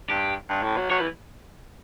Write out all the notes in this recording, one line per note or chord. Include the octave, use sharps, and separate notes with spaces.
G2 G4
G2
A2
F#3
F#3 C#5
B4
E3